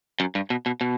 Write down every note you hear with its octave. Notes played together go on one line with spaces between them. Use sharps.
F#2
G2
B2
B2
B2